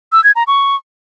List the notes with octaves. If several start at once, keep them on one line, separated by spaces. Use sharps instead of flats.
E6
G#6
A#5
C#6